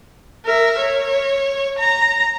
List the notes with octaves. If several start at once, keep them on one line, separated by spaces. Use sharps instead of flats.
A#4 E5
C#5
A#5